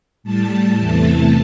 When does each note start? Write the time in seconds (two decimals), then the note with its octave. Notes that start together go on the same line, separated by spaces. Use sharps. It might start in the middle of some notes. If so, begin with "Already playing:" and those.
0.23 A2 G3 A5
0.78 E2 C3 E3 A3